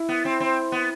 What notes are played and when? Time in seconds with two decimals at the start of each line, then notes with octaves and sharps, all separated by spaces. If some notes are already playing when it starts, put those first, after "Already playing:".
Already playing: E4
0.09 B3
0.25 C4
0.40 C4
0.72 B3